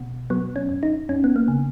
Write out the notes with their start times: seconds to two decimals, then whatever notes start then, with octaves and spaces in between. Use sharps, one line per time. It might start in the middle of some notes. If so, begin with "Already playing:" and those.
Already playing: B2
0.30 F#3 B3
0.56 C#4
0.69 F#2
0.83 D#4
1.09 F#2 C#4
1.24 B3
1.36 A#3
1.48 C#3